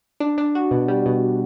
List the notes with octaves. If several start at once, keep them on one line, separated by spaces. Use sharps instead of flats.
D4
D4
F#4
B2
G3
B2